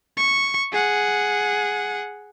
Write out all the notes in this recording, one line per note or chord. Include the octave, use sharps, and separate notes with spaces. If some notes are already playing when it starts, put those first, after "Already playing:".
C#6
G#4 F#5